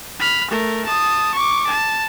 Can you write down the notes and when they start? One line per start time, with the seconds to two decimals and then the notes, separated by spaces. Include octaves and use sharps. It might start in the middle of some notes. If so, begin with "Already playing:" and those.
0.20 B5 F6
0.50 A3 A#4
0.86 A5 D#6
1.34 C#6 D6
1.66 A5